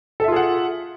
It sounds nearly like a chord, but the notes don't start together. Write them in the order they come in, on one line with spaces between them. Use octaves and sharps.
A4 E5 F4 G#4 F#5